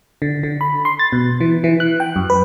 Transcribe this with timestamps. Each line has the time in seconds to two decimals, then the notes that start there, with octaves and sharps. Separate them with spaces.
0.22 D3
0.43 D3
0.61 B5
0.85 C6
0.99 A6
1.12 B2
1.40 E3
1.64 E3
1.80 F#6
2.00 G5
2.16 F#2
2.30 B4